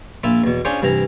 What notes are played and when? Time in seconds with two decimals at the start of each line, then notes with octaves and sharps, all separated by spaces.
0.24 A#1 E4 F4 E5
0.44 E2 B2
0.65 C#4 D4 F4 G#4 C5 C6
0.82 G2 C3 E3 A#5